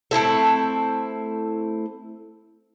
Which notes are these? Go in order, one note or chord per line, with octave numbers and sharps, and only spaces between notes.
A3 C4 E4 A4